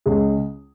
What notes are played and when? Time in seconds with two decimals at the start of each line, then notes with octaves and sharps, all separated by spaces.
0.06 C#2 G#4